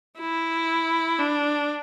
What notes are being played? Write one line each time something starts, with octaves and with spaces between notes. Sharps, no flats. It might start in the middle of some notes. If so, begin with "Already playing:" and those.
E4
D4